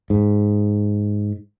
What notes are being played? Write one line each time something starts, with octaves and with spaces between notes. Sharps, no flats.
G#2